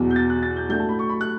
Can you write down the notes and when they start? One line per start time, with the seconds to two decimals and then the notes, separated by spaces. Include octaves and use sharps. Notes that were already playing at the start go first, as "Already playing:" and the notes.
Already playing: E2 B2 F#3
0.10 G6
0.16 A6
0.30 F#6
0.43 A6
0.56 G6
0.69 A2 F#3 A3 D4 G6
0.80 A5
0.89 B5
0.99 C#6
1.09 B5
1.21 F#6